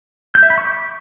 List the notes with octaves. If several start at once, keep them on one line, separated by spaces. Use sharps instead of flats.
G6
E5
B5
C#6
D6